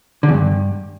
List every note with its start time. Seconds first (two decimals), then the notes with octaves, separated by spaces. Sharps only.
0.23 D3
0.29 E2
0.34 G2